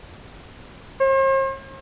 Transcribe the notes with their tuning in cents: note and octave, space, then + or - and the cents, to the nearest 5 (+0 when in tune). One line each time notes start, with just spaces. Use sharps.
C5 +45